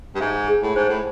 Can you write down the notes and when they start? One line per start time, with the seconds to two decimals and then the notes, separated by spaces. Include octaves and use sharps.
0.15 G2
0.20 G#2 E5
0.48 G#4
0.62 A2
0.75 G#2 C5
0.88 A2